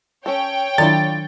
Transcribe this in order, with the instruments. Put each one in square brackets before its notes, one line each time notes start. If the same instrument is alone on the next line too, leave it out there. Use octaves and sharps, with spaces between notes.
[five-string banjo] C#4 A4 [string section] C#5 G5
[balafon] D#3 F#3 D4 [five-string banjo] E4 F4 D5 [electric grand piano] A6